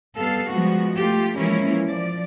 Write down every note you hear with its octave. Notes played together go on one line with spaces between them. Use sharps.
G3 B3 A4 F5
F3 G3 G#3 B3 F#4
A3 F4 G4
E3 F3 G#3 A#3 C#4 E4
F3 D5